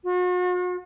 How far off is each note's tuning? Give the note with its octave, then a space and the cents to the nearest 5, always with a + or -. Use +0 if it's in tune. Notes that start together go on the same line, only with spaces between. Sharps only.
F#4 -45